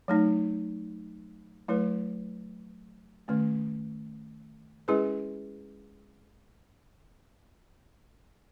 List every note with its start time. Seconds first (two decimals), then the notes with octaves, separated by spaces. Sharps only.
0.08 F#3 A3 D#4
1.68 F#3 A3 E4 B4
3.28 D#3 A3 C#4
4.88 G#3 C#4 E4 G#4 B4